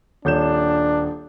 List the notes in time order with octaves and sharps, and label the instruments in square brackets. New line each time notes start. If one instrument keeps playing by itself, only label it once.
[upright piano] D#1 G6 E7 [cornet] D4